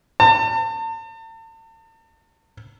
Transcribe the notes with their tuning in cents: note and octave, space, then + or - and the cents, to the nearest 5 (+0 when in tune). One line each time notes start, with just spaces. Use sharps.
A5 +40